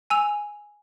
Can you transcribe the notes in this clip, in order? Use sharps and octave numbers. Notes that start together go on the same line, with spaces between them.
G#5 E6 F7